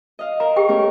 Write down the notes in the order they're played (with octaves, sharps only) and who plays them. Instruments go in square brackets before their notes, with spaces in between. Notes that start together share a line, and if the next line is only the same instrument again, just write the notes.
[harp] D#5 F5
[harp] A#4 [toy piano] A#5
[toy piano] G4 G#4 G5
[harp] A3 C#4 A#4